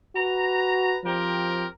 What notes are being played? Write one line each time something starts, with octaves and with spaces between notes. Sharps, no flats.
F#4 B4 A#5
F3 C4 G4 A#4